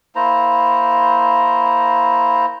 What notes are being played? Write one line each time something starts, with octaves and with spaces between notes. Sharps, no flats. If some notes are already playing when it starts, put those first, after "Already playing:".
A#3 E4 C5 A#5